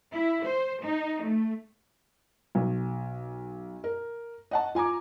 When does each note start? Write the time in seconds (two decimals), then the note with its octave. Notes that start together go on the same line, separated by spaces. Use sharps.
0.14 E4
0.46 C5
0.85 D#4
1.24 A3
2.55 B1
3.84 A#4
4.51 D#5 F#5 A5
4.75 F4 G#5 A#5 D6